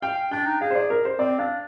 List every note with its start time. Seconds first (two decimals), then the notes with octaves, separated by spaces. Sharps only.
0.02 F5 G5
0.31 D4 G5
0.46 D#4
0.61 G#4 F5
0.70 C5
0.75 D5
0.90 A#4
1.05 C5
1.19 C4 D5
1.39 D4 F5